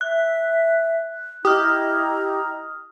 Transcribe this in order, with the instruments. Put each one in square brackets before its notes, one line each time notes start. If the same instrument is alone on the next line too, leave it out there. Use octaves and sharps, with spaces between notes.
[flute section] E5 [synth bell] F#6
[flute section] E4 D#5 A#5 [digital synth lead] G4 [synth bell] D#6 F6